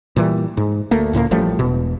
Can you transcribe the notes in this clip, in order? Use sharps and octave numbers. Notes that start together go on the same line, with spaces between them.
A#2 E3 G3
G#2
D2 A3 A#3
C#2 A2 G#3 A#3
A1 F3 G3 A3
E1 B2